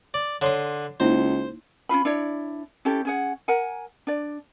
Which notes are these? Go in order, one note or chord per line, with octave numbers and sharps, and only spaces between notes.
D5
D3 C#5 C6 D#6
C#2 A#3 D#4 E4 C5
C#4 D#4 F4 B5
D4 E4 C#5 D5
C#4 E4 G4 A4
C#4 G#4 F#5
A#4 F#5 G#5
D4 D5